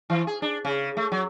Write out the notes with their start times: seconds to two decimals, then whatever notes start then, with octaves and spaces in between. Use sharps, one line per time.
0.10 E3
0.27 G#4
0.42 D4
0.65 C#3
0.97 A3
1.12 F#3